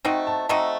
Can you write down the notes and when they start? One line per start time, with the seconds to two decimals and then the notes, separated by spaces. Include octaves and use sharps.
0.05 A3 C4 D#4 F#4 G5
0.27 A5
0.49 A3 C4 D#4 F#4 A#5